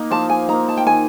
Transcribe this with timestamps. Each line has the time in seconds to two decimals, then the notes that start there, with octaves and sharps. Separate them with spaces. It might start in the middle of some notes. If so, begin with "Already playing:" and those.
Already playing: A#3 D#4
0.11 F3 A5
0.30 G#5
0.49 A#3 D#4 A#5
0.69 A5
0.77 G5
0.86 D#3 G#5